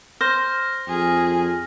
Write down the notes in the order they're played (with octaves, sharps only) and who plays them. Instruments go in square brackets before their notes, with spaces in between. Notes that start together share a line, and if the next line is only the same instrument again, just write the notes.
[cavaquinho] C5 [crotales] F6 A#6
[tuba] F2 [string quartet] G#4